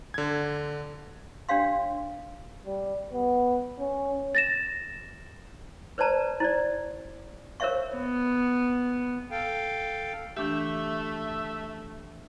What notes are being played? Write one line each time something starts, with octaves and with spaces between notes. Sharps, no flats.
D3 G#6
D4 G4 C#5 F5 C6
G3
B3
C#4
A6 A#6 E7
B4 C5 D5 A5 A#5
E4 C5 D5
A#4 C5 C#5 E5 F5 C#6
B3
A4 F5 G5
E3 A3 D4 G4 E5